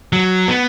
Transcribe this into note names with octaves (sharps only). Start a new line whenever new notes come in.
F#3
B3